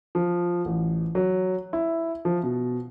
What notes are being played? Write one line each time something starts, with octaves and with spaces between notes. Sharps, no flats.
F3
A1
F#3
E4
F3
B2